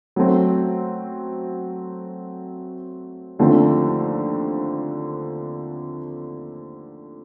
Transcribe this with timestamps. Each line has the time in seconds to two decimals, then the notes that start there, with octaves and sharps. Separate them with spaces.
0.16 F#3 A3 C4
3.39 D#2 D3 F3 A3 C4